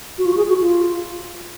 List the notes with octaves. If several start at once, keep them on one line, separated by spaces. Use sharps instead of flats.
F#4
F4
F#4
G#4
F#4
F4